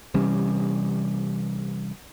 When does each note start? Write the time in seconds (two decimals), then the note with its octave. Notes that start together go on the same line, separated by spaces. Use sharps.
0.14 C3 E3 G3 C#4